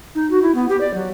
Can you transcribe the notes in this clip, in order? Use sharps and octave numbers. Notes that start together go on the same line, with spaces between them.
D#4
F#4
E4
B3
G4
D5
F#3